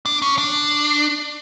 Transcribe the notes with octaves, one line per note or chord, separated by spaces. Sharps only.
D4
C#4
D4